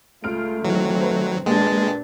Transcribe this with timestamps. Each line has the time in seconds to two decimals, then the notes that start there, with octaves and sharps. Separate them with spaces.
0.24 C#2 A3 F4 F6 D7
0.65 D#3 E3 F#3 G#3 C4
1.01 B4 C5
1.46 A#2 G#3 A#3 D4 G4 B4 A5 A6